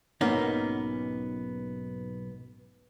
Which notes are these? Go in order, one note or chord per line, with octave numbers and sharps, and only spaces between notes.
B1 G#2 A#3 B3 C#4 D#4